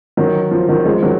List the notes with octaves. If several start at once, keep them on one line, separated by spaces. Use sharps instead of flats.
D#3 F#3
F3
D#3 F#3
F3 G#3
D#3 F#3